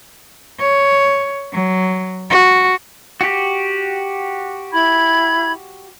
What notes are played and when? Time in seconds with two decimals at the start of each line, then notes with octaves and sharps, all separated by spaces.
0.60 C#5
1.53 F#3
2.30 F#4
3.21 F#4 G4
4.72 E4 B5 G#6